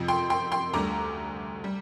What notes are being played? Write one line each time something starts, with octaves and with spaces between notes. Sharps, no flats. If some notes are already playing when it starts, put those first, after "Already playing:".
Already playing: F2 C3 F3
G5 C6
G5 C6
G5 C6
D2 D3 G3 A#5 D6
G3